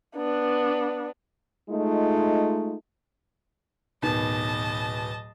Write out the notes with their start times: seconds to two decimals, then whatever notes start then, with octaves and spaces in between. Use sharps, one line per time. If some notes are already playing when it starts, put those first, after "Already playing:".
0.16 B3 D4
1.70 G#3 A3 D#4 F4
4.02 D1 B2 D#3 D#5 A5